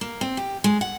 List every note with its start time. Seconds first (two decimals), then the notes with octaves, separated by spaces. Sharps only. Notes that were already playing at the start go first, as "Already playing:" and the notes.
0.01 A#3
0.21 C4
0.37 G4
0.64 G#3
0.81 F#5